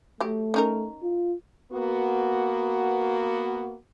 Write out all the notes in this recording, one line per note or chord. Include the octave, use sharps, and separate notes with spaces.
F#3 A3 G4
C#4 D#4 A#4
F4
A#3 B3 F#4